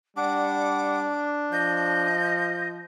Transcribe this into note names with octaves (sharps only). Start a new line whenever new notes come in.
G3 D4 F#5 D6
F3 D#5 G6